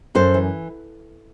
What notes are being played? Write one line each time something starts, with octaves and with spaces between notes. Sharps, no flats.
F#2 A4 C5
E3